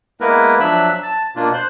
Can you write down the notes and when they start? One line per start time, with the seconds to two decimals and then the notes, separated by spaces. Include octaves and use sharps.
0.21 G#3 A#3 B3 E4 A#4 B4
0.60 F3 F#3 D4 E5 E6 F#6
1.03 A5
1.36 B2 A#3 D4 F4
1.54 C5 C6 F#6